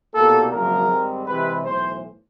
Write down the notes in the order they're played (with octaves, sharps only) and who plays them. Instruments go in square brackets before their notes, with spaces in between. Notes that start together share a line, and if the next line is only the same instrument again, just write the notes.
[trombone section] C2 B2 G3 A#3 A4
G#1 F#2 C#3 F3 A#3 A#4
G#2 D#3 G3 C4
C2 C3 E3 G#3 B4
B1 A2 E3 C5